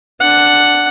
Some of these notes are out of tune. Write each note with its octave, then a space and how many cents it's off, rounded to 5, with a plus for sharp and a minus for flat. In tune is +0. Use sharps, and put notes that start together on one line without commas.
D4 +0 F#5 +0